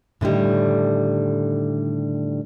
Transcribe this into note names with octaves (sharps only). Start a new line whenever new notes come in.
A2 D3 D#3 G3